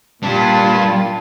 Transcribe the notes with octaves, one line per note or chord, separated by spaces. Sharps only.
A#2 G3 D4 F4 A5